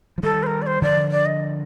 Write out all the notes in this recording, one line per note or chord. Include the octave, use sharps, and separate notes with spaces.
F3
D#3 G3 A4
C5
A#4
D5
C5
D3 F3 D5
D5
D#5